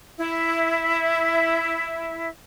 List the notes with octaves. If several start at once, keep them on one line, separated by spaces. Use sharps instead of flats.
E4 E5